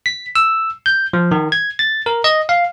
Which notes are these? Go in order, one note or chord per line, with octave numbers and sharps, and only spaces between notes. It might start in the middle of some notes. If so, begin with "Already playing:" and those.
B6
E6
G6
F3
D#3
G#6
A6
A#4
D#5
F5